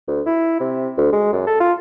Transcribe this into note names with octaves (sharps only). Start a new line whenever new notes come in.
D2
E4
C3
D2
G#3
F#2
A4
F4